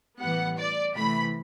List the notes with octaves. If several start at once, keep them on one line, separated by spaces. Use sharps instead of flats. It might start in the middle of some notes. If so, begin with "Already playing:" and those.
A2 E3 G3 B3 F#5
D5
C3 E3 A3 B5